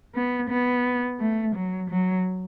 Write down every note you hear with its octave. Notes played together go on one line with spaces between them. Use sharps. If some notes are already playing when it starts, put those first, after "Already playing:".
B3
B3
A3
F#3
F#3